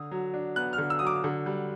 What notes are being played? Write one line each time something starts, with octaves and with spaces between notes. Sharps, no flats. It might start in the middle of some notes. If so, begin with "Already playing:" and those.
Already playing: D3 D#6
F#3
D4
B3 F#6
F6
D3
E6
F#3 D#6
D6
D3
G3